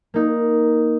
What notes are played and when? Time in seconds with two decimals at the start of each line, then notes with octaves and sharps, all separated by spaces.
0.14 A#3 D#4